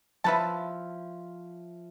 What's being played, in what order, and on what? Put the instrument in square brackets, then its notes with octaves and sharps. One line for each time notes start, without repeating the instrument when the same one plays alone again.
[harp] F3 C#5 E5 [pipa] E4 B4 A5